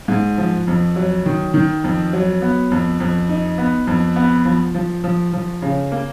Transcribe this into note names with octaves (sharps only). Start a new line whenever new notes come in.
G#2
F3
F2
F#3
D#3
D#3
F2
F#3
B3
F2
F2
D#4
B3
F2
B3
F3
F3
F3
F3
C#3
A#3